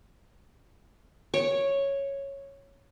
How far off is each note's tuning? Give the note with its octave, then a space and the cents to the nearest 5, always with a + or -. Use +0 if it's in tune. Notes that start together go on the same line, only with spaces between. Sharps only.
C#5 -5